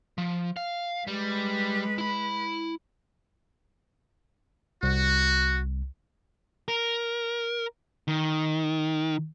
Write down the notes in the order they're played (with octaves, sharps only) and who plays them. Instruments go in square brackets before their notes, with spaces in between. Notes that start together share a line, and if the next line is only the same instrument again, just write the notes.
[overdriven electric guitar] F3
F5
[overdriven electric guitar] G3 [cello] G#3 B4
[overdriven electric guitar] E4 B5
[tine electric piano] C2 [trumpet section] F#4
[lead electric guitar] A#4
D#3